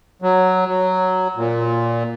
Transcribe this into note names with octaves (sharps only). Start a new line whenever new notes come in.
F#3
F#3
A#2